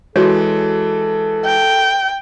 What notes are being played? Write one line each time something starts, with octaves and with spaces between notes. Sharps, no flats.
E3 G#3 F#4 A4 C#5
G5